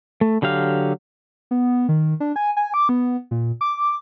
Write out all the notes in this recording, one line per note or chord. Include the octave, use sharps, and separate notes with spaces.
A3
D3 F#3 G4 F5
B3
D#3
D4
G#5
G#5
D6
B3
A#2
D6